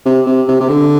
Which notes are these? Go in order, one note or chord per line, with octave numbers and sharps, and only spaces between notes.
C3
C3
C3
C3
D3